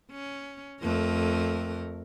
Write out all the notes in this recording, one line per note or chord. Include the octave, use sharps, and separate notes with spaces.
C#4
F2 A3 A#4